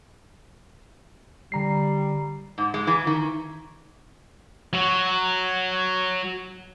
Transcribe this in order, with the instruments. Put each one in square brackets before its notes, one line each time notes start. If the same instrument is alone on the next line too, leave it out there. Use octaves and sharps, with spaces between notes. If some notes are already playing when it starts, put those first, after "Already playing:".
[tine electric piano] D3 A#5 C7 [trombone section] G3
[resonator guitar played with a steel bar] G#2
G#3
E3
D#3
[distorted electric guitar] F#3 F#4